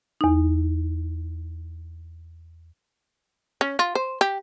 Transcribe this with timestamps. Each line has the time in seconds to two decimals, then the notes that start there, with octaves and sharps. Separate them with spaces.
0.21 E2 D#4
3.61 C#4
3.79 F4
3.95 C5
4.21 G4